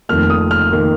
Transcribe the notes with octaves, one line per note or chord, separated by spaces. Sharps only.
F1 F2 D#3 A#3 F6
D#6
F6
D#3 A#3